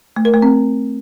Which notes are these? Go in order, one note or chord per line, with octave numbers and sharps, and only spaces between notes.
A3
A#4
A3
C4